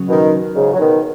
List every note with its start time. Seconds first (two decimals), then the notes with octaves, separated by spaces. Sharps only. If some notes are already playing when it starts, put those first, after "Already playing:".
Already playing: F#2 C#3 F#3
0.08 B2 D#3
0.56 G#2 C#3
0.74 F#3
0.79 B2 D#3